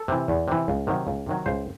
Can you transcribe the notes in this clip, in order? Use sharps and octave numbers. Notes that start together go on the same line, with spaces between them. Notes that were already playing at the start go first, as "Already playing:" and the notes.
Already playing: A4
C3 E3
E2
C3 E3
C#2
C3 D#3 F#3
C#2
C3 D#3 F#3
C#2 C5